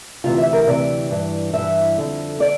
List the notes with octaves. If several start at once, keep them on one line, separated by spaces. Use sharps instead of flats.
D2 C3 E3 F4
E5
A#4
D2 C3 E3 D5
G2 E3
G2 E5
E3
F2 D3
D3 D5